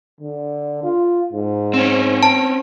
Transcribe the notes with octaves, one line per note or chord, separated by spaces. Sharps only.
D3
F4
G#2
C4 C#4
A5